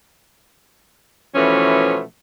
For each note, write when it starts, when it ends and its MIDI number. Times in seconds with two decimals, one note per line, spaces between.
1.35 2.01 47
1.35 2.01 52
1.35 2.01 53
1.35 2.01 57
1.35 2.01 61